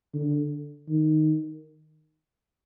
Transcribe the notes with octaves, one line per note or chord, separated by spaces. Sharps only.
D3
D#3